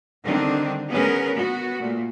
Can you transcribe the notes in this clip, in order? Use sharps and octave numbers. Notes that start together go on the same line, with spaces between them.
D3 D#3 G3 C4 D4
B3 C#4 G#4 A#4 B4
B3 F#4
A#2 A3